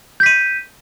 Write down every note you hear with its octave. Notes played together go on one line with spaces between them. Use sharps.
G6 B6 D#7